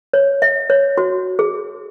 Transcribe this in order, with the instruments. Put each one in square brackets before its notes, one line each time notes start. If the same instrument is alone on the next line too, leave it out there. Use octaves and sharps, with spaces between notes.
[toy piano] C#5
E5
C#5
F#4
G#4